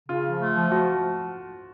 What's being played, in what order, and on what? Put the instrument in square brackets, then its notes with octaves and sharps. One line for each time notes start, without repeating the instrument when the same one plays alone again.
[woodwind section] C#3 [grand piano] F4
[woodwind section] F3
A3
F3
[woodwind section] F3 [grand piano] F#4